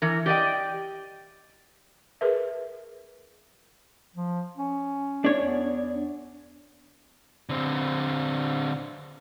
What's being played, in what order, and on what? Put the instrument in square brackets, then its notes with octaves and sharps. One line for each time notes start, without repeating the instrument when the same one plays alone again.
[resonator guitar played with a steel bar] E3 A#4
G4 D5 D#5 G5
[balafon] G#4 A#4 B4 E5
[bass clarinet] F3
C#4
[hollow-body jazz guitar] D4 C#5
[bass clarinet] E2
[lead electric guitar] D3 C4